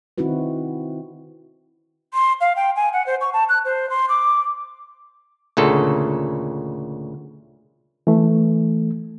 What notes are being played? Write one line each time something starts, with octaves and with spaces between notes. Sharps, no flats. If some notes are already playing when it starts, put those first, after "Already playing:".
D#3 C4 D#4 E4 F#4 B4
C6
F5
G5
G#5
F#5
C5
C#6
A5
F#6
C5
C6
D6
D2 A#2 C#3 A4
E3 A3